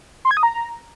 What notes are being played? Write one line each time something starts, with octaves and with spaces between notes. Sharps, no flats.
C6
G#6
D#6
A#5